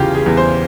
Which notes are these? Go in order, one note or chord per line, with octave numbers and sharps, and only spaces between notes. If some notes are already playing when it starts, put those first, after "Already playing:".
Already playing: E2 C#3 E3 F4 G4
G#4
E2
C5